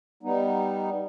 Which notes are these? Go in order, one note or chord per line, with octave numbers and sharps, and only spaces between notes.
G3 B3 D#4